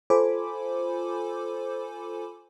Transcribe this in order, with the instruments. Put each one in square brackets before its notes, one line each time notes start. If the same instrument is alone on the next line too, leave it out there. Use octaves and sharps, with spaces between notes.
[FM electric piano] F4 A4 C5 G#5 B5 D6